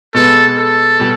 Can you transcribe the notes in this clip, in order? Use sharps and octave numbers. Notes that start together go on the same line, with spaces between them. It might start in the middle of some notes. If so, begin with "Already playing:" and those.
B2 G#3 B3 A4
A4
B2 G3